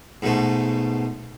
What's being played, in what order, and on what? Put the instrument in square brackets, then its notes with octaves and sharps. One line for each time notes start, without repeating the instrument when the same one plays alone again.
[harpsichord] G#2 B2 A3